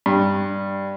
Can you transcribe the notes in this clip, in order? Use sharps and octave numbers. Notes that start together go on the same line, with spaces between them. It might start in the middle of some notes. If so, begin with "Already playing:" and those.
G2